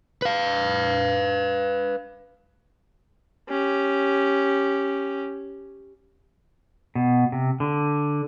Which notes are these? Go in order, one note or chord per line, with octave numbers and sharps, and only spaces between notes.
B4 F5
C#4 G4
B2
C3
D3